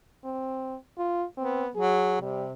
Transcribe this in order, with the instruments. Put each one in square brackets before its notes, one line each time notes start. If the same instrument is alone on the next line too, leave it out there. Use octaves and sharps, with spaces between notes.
[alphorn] C4
F4
[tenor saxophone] B3 [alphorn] C4
[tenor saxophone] F#3 [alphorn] G#4
[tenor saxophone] C3 [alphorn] G3